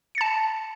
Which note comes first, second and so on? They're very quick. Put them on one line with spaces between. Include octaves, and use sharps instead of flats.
C#7 A6 A5